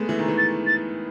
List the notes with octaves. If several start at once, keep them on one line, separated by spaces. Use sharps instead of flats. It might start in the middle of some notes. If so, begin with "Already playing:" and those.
Already playing: G#3 A3 B3
E3
D#3
E3
A6
A6